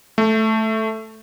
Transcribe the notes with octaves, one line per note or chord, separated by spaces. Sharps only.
A3